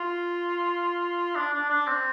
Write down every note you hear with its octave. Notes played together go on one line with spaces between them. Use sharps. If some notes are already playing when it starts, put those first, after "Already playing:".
Already playing: F4
D4
D4
D4
C4